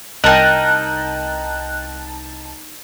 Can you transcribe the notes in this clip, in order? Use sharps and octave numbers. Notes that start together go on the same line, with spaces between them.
C2 D#4 A#4 D#5 G5 A5 F#6